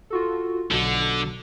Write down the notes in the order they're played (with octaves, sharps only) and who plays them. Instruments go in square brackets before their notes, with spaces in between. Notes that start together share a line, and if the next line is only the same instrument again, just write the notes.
[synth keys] F4 F#4 A4
[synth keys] B1 B2 [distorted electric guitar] D3